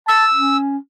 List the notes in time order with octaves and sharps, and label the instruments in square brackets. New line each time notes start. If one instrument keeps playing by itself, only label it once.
[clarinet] A5 [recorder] E6
[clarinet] C#4